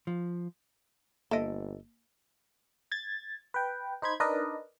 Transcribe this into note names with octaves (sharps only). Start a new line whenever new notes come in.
F3
G1 A#3 A4 D#5 E5 D7
G#6 A6
B4 G5
D#4 C5 B5 G#6
D4 D#4 A#4 B4 D5 D#5